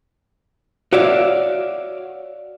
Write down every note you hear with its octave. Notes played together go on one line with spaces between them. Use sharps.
F#4 C#5 D5 E5 F5